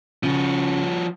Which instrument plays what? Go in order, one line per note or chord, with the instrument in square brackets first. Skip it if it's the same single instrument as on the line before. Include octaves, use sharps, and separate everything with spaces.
[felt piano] C#3 [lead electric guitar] F3 F#4